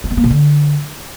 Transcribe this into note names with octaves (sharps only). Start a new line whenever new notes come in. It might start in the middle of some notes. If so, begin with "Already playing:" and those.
C#4
B3
A#3
B2
D3